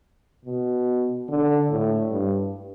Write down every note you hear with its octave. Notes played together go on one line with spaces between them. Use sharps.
B2
D3
A2
G2